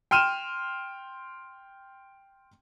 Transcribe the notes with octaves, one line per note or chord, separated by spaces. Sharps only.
G5 C6 F6 D#7 E7